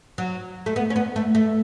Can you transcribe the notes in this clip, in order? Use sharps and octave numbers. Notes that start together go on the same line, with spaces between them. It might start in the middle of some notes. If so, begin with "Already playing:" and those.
F#3
A3
B3
C#4
B3
A3
A3